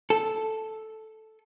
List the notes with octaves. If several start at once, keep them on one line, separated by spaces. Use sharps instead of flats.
A4